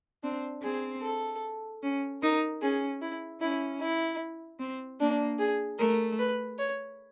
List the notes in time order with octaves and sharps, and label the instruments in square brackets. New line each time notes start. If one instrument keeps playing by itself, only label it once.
[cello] C4 [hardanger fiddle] D4
[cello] C4 [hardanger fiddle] G#4
[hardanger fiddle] A4
[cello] C#4
[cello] D#4 [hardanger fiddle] A#4
[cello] C#4 [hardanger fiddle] G#4
[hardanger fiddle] E4
[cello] C#4 [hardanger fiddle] E4
[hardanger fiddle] E4
[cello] C4
[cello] A#3 [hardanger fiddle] D4
[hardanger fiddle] G#4
[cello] A3 [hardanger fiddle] A#4
[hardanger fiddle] B4
C#5